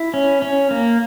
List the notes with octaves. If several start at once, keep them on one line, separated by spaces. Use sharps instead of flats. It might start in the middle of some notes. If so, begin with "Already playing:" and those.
Already playing: E4
C#4
C#4
A#3